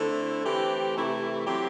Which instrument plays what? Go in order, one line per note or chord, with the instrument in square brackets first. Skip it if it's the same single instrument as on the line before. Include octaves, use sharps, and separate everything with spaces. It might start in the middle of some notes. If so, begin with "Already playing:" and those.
Already playing: [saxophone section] D3 A3 C4 E4
E3 A3 C4 G4
C3 E3 A3 E4
F#3 C4 G4